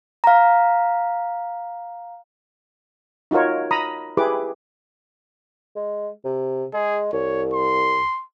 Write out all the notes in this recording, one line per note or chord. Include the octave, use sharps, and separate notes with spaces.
F5 A#5
D#4 F4 F#4 A#4 C#5
A#5 B5 D#6
E4 G4 G#4 B4 D6
G#3
C3
G#3 G#4
C2 C#5
C6